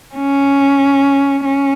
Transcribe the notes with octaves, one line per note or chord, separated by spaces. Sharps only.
C#4
C#4